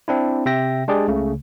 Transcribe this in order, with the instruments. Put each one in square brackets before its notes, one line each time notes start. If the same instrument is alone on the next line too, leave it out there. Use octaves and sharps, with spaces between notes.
[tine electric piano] C4 D4 E4
C3 E5 G5 A#6
G#3 D4 G4 G#4 D5
C#2 C#3 A3